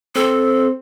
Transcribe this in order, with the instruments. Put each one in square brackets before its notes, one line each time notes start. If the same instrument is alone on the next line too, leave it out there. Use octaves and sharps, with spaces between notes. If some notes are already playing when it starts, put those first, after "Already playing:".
[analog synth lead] C4 [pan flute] A4